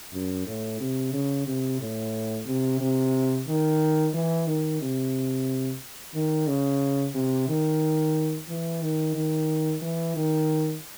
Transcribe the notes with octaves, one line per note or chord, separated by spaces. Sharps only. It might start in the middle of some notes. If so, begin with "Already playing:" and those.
F#2
A2
C3
C#3
C3
A2
C3
C3
D#3
E3
D#3
C3
D#3
C#3
C3
D#3
E3
D#3
D#3
E3
D#3